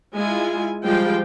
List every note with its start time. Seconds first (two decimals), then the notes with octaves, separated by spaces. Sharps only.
0.13 G#3 E4 F4 G#5
0.84 F3 G3 G#3 C5 F5 G5